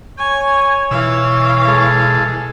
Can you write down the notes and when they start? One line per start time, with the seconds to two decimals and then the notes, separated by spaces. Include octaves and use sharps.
0.18 C#5 G#5
0.91 B2 E3 F5 E6
1.68 G#3 A4